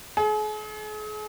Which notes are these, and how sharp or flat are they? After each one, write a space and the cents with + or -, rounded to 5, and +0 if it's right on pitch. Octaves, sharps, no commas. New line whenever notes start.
G#4 +40